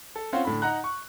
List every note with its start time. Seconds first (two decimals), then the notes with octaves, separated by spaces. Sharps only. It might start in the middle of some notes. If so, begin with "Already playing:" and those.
0.16 A4
0.33 C4 C#4 F4 C5 F5 F#5
0.45 A2 D3 B5
0.62 D#4 F#5 A#5 F#6
0.84 C#6